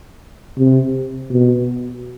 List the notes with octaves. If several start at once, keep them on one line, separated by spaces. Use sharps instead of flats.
C3
B2